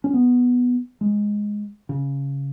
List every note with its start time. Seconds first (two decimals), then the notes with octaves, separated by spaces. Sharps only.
0.04 C#4
0.14 B3
1.01 G#3
1.89 C#3